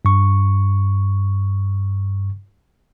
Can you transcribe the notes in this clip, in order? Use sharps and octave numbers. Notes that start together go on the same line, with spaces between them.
G2 C#6